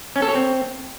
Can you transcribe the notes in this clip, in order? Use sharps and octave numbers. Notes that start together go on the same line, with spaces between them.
C#4
A4
C#5
C4